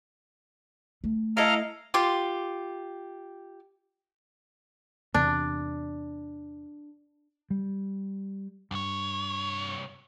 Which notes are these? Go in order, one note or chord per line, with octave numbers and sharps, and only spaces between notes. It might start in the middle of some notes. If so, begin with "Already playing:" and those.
A3
E4 A4 D#5 F5 A#5 F6
F4 G4 C6 D6
E2 C3 D4
G3
C2 G2 C#5